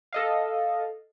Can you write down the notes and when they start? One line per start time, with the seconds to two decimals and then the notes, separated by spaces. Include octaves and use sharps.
0.13 A4 D#5 F5